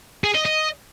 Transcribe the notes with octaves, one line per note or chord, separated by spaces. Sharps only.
G#4
D#5
D#5